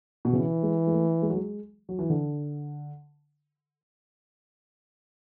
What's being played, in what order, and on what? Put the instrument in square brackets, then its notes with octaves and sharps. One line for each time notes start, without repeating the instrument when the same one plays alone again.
[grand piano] B2
[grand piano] C#3 [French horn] E3
[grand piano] G#3
G#3
A3
G#3
F#3
G#3
F#3
E3
D3